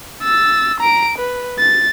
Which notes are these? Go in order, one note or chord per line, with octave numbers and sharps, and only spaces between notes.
E6 A6
A#5 D7
B4
A6